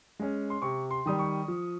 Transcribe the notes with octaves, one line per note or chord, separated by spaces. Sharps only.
G#3 C#4
C6
C3 C#6
C6
D#3 G3 D#6
C#6
F3